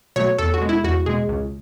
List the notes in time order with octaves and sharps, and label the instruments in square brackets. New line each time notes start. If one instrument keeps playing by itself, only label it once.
[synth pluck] B2 F#3 A3 C#5
E2 A4
F#4
B2 G#3
E4
E2 F#4
B2 G#3 G#4
C#2